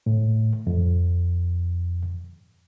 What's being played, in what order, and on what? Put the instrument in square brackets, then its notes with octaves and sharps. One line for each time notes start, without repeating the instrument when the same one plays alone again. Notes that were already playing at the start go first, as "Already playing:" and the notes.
[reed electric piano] A2
F2